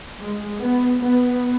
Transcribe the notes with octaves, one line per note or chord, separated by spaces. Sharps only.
G#3
B3
B3